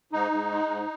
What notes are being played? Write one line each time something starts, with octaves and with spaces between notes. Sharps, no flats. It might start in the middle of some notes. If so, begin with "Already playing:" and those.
G#2 D#4
G#2
G#3
G#2